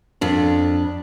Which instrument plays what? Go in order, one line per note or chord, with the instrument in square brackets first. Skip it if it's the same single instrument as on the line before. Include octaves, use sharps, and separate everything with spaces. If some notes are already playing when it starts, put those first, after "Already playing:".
[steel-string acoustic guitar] F2 D4